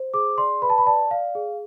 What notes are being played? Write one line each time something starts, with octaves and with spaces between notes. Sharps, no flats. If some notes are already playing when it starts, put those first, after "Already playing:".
Already playing: C5
G#4 D6
D5 C6
B4 B5
A5
B5
D5 A5
D5 F5
G#4